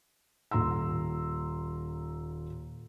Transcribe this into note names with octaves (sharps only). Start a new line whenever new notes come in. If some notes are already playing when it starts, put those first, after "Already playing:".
D#1 A#5 C6 E6